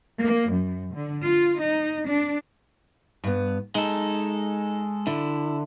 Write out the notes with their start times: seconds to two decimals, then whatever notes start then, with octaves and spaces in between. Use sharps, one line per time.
0.19 A#3
0.50 F#2
0.94 D3
1.24 F4
1.59 D#4
2.08 D4
3.24 G2 B3
3.75 G#3 D#4 A4
5.07 D3 E4